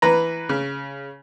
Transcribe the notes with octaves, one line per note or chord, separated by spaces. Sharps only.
E3 B4 A#5
C#3